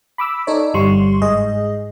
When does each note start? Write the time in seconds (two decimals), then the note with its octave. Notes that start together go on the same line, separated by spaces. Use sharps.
0.18 B5 D6 E6
0.47 D#4 A4 C#5 D5
0.74 G1 G3 C6 C#6
1.22 G#2 G#4 D#5